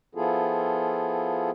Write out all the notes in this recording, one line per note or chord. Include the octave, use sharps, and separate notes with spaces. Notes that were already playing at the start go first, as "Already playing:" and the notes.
F3 B3 E4 F4 G#4 A4